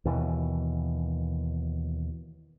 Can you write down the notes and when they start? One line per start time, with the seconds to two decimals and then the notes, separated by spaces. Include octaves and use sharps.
0.05 D#2 B2 E3